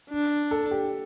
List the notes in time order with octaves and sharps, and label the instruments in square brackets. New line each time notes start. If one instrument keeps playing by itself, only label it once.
[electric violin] D4
[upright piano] A4
G4